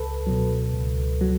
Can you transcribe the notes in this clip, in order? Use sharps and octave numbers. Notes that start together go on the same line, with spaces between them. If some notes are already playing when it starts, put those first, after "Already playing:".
Already playing: C#2 A4 B4
B2 F#3
C#2
F#3